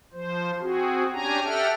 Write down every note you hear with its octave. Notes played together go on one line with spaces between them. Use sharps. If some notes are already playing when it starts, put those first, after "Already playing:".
F3 C5
C4 F#4 G#4
C#4 D4 G4 G#5 A#5
G4 A4 E5 F#5 G5 F6